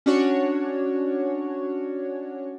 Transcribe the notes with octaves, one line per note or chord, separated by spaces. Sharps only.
C#4 D4 F#4 C#5